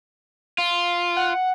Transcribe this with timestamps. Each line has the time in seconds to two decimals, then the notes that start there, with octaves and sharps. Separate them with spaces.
0.58 F4
1.17 F#5